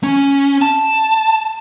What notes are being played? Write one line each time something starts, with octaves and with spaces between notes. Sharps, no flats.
C#4
A5